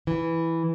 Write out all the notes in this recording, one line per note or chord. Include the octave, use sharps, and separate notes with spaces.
E3